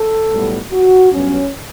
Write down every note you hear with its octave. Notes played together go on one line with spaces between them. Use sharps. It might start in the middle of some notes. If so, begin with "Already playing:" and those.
Already playing: A4
B1 A2 G3 B3
F#4
G2 F#3 B3 C#4